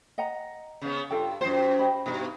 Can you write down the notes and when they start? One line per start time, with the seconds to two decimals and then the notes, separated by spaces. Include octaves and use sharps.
0.18 D#5 F#5 A#5
0.82 C#3 B3
1.10 G2 F4 A4 G5
1.41 F#2 F4 C5 G5
1.79 G4 D#5 B5
2.06 G2 B2 D#4 B4